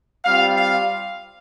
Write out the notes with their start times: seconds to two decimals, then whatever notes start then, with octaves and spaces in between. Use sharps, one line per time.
0.25 G3 C4 F4 F5
0.57 F5